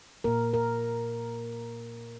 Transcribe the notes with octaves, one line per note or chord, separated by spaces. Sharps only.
A#2 A#3 A#4
A#4